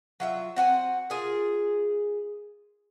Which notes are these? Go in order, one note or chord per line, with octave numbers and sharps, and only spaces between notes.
F#3 F4 E5
C4 F#4 F#5 G#5
F4 G#4 A#4